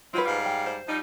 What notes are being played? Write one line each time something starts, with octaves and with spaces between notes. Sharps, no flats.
F#3 C4 D#4 F4 B4
G#2 G3 F5
G5
C5
F3 G3 D#4